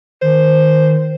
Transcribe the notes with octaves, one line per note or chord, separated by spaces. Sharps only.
D#3 C5